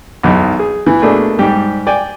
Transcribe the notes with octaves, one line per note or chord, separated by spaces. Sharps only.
B1 E2 D#4
G#4
E3
B2 A3 A#3 D4 G#4
G#2 G3 G4
D5 G5 G#5